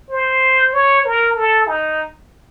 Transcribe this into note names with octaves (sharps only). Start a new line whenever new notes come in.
C5
C#5
A#4
A4
D#4